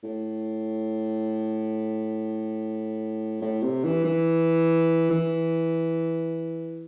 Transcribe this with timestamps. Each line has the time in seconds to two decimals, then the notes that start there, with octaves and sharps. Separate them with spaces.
0.03 A2
3.41 A2
3.62 C3
3.84 E3
4.05 E3
5.10 E3